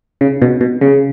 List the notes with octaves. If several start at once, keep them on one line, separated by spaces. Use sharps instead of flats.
C#3
B2
B2
C#3